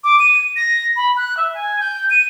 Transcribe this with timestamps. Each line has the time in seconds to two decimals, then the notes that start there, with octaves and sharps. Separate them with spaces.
0.04 D6
0.19 D#7
0.56 A#6
0.96 B5
1.17 F#6
1.37 E5
1.54 G#5
1.80 G6
2.10 D#7